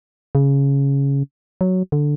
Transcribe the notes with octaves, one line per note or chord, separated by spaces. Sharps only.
C#3
F#3
D3